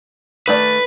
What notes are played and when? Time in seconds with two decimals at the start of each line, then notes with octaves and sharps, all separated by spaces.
0.48 D#3 A3 B4 D5